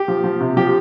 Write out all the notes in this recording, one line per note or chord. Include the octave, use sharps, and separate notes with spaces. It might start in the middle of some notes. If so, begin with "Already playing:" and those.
Already playing: G4
F3
F3
C3
F3 G4